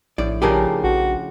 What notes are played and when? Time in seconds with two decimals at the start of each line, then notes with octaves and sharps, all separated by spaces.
0.18 A#1 A2 D5
0.42 C#3 F3 D4 G4 G#4 A#4
0.84 A#1 F#4